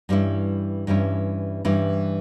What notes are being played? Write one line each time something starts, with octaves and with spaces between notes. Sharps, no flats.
G2 E3 G3 C#4 E4
G2 E3 G3 C#4 E4
G2 E3 G3 C#4 E4